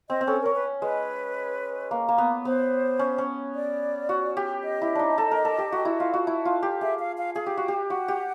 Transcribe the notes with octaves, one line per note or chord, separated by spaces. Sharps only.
C4 D#5
C4
C#4 A4
C#4 A#4
B4
G#3 B4
A#3
A#3
B3
B3 C5
C#4
C#4
D5
F#4
G4
D#5
E4
D4 D#4
A4
A#4
A4
G4
F#4
E4
F4
F#4
E4
F4
G4
G#4 E5
F5
F5
G#4 F5
G4
F#4
G4
F#4 F#5
G4